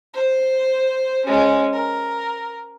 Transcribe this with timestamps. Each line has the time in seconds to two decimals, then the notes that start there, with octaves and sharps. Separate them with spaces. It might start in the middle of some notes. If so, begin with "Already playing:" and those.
0.14 C5
1.26 G#3 C#4
1.73 A#4